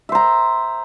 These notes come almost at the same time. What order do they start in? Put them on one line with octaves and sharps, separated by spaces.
E5 C5 A#5